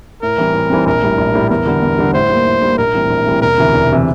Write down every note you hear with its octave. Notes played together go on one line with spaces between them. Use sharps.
A2 A#4
E3 G3 C4
A2
E3 G3 C4
A#1 A#4
A2 G3
A#1
A2 G3
E2 A#4
D3 G3
E2
D3 G3
A2 C5
G3 A#3
A2
G3 A#3
A#1 A#4
A2 E3 G3 C4
A#1
A2 E3 G3 C4
E1 A#4
D2 C3 E3
E1
C3 E3